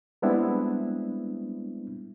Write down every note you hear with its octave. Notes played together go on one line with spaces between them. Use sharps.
G3 G#3 B3 C4 D4 E4